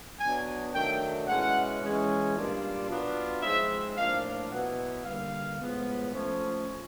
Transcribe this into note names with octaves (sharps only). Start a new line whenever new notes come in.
F#3 B3 D4 G#5
D#3 F#3 A3 D4 G5
B2 G#3 C#4 E4 F#5
E3 G#3 C#4
A#2 G3 A#3 D4 F4
F#3 B3 D4 F4
F3 G#3 C4 D#4 E5
A2 F3 A#3 D4 F4 F5
B2 F#3 B3 E4 F#5
D3 G3 A#3 F5
A2 F3 G#3 B3
F3 A3 C#4